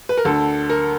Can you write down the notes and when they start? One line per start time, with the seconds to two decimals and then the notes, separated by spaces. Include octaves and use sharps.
0.09 B4
0.17 A#4
0.25 D2 D3 A4
0.70 A#4